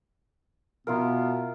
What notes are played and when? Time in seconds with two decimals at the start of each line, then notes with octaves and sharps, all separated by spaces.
0.87 B2 B3 E4 F4 A#4